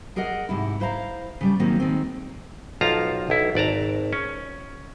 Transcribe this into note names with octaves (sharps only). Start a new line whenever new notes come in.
G#4 A#4 D5 D#5 F#5
G#2 C3 E4
E4 C5 F5 A#5
C#3 G3 D5
D#3 F#3 A#3 C4 C#4
D#3 G#3 A3 C4
B1 F3 F4 F5 A5 A#5
B1 E4
G#1 D5 A5 A#5
C#4